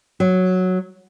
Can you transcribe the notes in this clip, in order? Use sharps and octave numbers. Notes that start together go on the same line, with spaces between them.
F#3